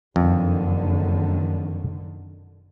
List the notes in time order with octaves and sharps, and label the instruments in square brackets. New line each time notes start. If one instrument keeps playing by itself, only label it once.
[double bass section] F#1 D3 D#3 [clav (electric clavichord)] F2